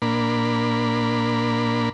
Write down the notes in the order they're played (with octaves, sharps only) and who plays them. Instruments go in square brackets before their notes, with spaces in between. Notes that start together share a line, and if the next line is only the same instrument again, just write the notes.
[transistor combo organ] A#2 A#3 D4 B5